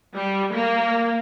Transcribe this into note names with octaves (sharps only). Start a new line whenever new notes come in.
G3
A#3